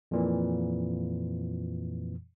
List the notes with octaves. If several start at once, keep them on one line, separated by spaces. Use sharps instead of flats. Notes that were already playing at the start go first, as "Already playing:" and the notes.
F2 A#2 E3